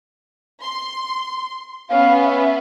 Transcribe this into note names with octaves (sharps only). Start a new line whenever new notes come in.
C6
B3 C#4 F5
E5